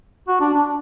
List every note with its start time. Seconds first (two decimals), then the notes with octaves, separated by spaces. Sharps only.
0.28 F#4
0.41 D4
0.54 D4